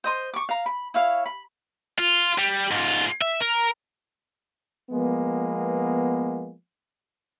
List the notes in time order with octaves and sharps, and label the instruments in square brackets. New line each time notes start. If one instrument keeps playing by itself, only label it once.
[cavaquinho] C5 D#5 C6
C#6 D6
F5 A#5
B5
E4 C#5 F5
B5
[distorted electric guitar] F4
G3
G#2 F4
E5
A#4
[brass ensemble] F3 G#3 A#3 B3